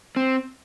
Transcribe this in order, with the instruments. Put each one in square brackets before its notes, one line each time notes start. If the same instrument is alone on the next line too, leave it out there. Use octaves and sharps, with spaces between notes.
[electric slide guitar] C4